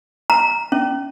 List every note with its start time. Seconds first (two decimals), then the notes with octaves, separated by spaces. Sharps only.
0.30 A#5
0.72 C#4